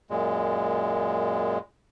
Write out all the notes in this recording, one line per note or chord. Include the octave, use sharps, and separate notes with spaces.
F#2 A#2 G#3